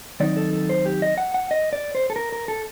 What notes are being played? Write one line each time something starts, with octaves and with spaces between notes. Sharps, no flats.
D#3 F#3 C4 D#4 D5
A4
A4
C5
G4
D#5
F#5
F#5
D#5
D5
C5
A4
A#4
A#4
A4